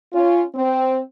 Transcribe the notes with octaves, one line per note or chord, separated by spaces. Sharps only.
C#4 F4
C4